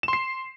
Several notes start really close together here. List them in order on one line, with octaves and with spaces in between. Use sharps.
E7 C6 C7